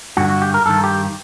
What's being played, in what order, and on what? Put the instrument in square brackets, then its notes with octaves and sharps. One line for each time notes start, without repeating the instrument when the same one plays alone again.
[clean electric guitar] G2 D3 F#4
F#4
G4
A#4
G2 D#3 A4
G4